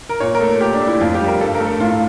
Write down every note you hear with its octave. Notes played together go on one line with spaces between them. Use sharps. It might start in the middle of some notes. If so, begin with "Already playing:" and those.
A#4
A#2 C#5
A#4
A3 A4
A#2 G4
D4
A3
E4
F2 F4
G4
G3
A#4
G2 A4
A#4
A3
A4
A2 F4